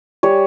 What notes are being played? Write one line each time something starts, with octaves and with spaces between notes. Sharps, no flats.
G3 C#5